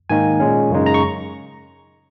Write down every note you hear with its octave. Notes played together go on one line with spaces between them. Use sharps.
G#2 D#3 A#3 D#4 G#5
A#2 G#3 C#4
F#2 C#3 G#3 D#4
A#5
C#6